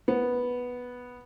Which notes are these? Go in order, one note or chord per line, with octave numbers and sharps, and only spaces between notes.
B3